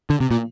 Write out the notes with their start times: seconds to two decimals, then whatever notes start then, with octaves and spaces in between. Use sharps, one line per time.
0.10 D3
0.20 C3
0.31 A#2